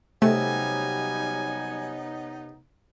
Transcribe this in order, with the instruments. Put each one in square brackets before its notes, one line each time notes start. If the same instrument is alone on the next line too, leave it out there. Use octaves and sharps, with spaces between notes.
[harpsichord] C3 [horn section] F#3 G3 G#5 [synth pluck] A3 [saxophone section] B3 C#4 D#4